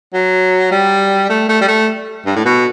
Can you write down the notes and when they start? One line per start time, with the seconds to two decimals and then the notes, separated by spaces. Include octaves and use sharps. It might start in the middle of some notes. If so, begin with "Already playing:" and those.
0.14 F#3
0.71 G3
1.29 A3
1.49 A3
1.61 G3
1.68 A3
2.26 G2
2.36 A2
2.45 B2